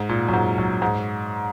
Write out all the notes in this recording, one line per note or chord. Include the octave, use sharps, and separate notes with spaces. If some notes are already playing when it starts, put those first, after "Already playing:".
Already playing: G#2
A#2
F#2
G#2
F#2
G#2